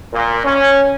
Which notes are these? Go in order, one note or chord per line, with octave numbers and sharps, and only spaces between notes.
A#2
C#4